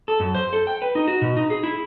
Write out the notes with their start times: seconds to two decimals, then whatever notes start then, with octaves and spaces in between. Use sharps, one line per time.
0.08 A4
0.20 F#2
0.35 C5
0.53 A4
0.67 G5
0.82 B4
0.95 D#4
1.07 F#4
1.22 B2
1.37 D#4
1.50 G#4
1.64 E4